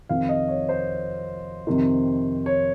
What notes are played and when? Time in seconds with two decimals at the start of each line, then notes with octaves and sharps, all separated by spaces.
0.09 F2 C3 D#3 F5
0.29 D#5
0.48 C#5
0.69 C5
1.67 F2 C3 D#3
2.46 C#5